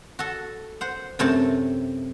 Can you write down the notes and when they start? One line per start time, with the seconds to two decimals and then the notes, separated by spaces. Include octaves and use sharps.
0.19 F#4 A4
0.81 C5 F#5
1.19 F#2 C3 A3 C4 A5